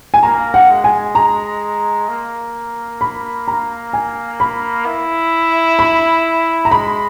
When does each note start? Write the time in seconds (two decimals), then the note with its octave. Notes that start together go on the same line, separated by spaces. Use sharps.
0.14 G#5
0.22 A#3 A#5
0.54 F#5
0.69 G#3
0.84 G#5
1.15 A#5
2.09 A#3
3.01 B5
3.48 A#5
3.93 G#5
4.40 B5
4.86 E4
5.79 B5
6.65 A#5
6.71 G#3 B5